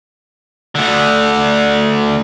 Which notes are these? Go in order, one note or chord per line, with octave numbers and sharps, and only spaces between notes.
D2 D3